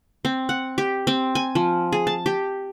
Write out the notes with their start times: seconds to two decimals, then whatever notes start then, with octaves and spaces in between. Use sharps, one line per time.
0.25 C4
0.49 F#5
0.78 G4
1.07 C4
1.35 G#5
1.55 F3
1.92 G#4
2.07 A5
2.26 G4